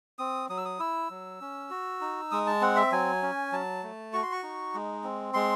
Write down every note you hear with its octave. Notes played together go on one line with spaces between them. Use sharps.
C4 D#6
F#3 D#6
E6
D#6
E4 E6
F#3
C#4
F#4
D#4
G#3 D#6
A5
C4 F#5
E5
F#3 G#5
C#4
F#3 A5
A3
F#4 C#6
C6
C#6
D#4
G#3
C4
G#3 C6